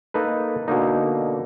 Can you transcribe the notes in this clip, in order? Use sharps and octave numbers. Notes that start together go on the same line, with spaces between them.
A#3 D#4 A4 B4
B2 D3 A#3 D#4